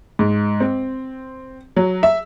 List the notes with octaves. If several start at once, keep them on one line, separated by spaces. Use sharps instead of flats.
G#2
C4
F#3
E5